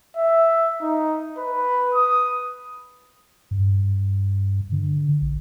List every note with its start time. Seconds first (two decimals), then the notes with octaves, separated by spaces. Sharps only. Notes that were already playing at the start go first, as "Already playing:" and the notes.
0.17 E5
0.82 D#4
1.38 B4
1.94 D#6
3.51 G2
4.72 D3
5.22 A#1